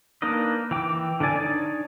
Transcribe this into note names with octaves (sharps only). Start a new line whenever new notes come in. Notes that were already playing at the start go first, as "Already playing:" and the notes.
A#3 D4 D#4 B4 D#5
E3 G5 D6
D3 E3 D4 D5 G#5
D4 D#4 C#5 D5